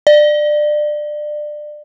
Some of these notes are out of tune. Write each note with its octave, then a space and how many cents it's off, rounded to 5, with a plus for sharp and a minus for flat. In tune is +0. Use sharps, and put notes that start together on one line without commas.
D5 +25